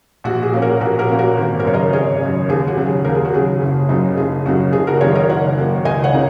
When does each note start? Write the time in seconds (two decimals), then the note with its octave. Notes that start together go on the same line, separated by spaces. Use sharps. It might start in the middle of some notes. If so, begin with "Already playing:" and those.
0.24 A#1 F#4
0.43 G#4
0.52 A#2 A#3 C#4
0.62 F#4 A#4
0.80 A#1 F#4 A#4
0.99 F#4 A#4
1.09 A#2 A#3 C#4
1.19 F#4 A#4
1.37 G#1
1.60 A#4
1.65 F#2 C#3 C#5
1.74 A#4 D#5
1.93 G#1 G#4 C#5
2.20 F#2 C#3
2.49 D#2 G#4
2.67 F#4
2.77 C#3 F#3
2.86 G#4
3.04 D#2 A#4
3.15 G#4
3.25 F#4
3.33 C#3 F#3 G#4
3.61 F#1
3.89 F#2 C#3 F#3 D#4
4.17 F#1 G#4
4.46 F#2 C#3 F#3 D#4 F#4
4.73 F#1 G#4
4.87 F#4 A#4
5.01 F#2 D#3 A#3 G#4 C#5
5.15 A#4 D#5
5.29 F#1 C#5 F#5
5.57 F#2 D#3 A#3
5.85 C#2 D#5 G#5
6.04 C#5 F#5
6.14 C#3 A#3 D#4